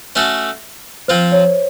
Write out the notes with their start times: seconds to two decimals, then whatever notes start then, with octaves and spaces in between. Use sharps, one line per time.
0.16 A3 C#4 F#4 A4
1.08 F3 C4 F4 C5
1.32 C#5